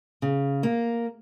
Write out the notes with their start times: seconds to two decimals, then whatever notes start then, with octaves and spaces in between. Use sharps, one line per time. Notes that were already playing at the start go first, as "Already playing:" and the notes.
0.22 C#3
0.63 A#3